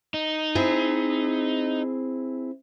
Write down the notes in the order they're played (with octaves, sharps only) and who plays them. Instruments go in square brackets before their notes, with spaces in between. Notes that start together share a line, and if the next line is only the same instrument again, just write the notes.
[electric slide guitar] D#4
[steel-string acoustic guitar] C4 E4 G#4